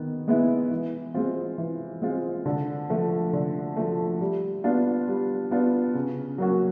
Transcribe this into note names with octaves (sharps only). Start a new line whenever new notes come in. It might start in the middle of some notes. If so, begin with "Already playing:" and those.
Already playing: D#3 B3
G#3 B3 E4
E3
G#3 C4 F4
E3
G#3 C4 F4
D3
F3 A3
D3
F3 A3
G3
B3 D4 F4
G3
B3 D4 F4
C#3
F#3 A#3 C#4 F#4